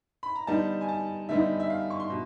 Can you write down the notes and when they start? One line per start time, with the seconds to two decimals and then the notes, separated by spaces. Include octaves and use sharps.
0.23 B5
0.36 A#5
0.47 D3 G3 B3 D#4 A5
0.81 G#5
0.89 A5
1.29 D3 G3 B3 D#4 E5
1.60 E5
1.70 F5
1.90 C#6
2.00 C6
2.10 B2